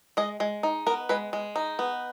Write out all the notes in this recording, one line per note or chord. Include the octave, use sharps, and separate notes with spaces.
G#3 D#5
G#3
D#4
B3 A#4
G#3 B4
G#3
D#4
B3